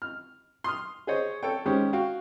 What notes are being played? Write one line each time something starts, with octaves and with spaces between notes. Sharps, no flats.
F6
C6 D#6 F6
G#4 C5 C#5 D#5
A4 C#5 G5
D#3 G#3 C#4 G4 C5
F#4 F5 G5